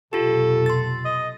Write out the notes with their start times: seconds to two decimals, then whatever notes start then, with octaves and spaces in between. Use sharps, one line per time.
0.13 F1 B2 F#3 F4 G4 A4
0.66 C6 A6
1.05 D#5